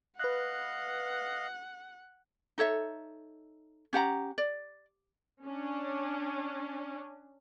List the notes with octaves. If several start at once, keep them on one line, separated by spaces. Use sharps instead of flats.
B4 D#5 F5 F#5 F#6
D#4 A4 C#5 E5
C#4 G4 F#5 A#5
D5
C#4 D4